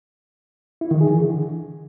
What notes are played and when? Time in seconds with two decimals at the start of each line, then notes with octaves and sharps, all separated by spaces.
0.81 E4
0.91 D#3
1.01 G#4
1.11 E3
1.20 D3